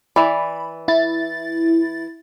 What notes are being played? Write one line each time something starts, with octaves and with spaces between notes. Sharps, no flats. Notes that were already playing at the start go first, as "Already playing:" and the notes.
E3 D5 B5
E4 A6